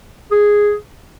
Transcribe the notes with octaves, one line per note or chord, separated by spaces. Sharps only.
G#4